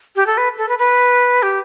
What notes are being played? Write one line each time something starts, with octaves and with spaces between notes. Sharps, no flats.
G4
A4
B4
A4
B4
B4
G4